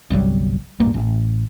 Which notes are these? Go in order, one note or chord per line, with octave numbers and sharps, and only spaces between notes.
G1 C2 F#3 G3
E1 A1 G2 A#3
A1